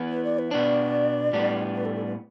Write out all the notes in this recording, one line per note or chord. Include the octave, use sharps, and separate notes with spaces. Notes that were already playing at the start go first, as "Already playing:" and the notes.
Already playing: E3 B3 E4
B4
D5
B4
B2 B3 D4 D5
A2 G3 B3 D4
B4
A4
A4
B4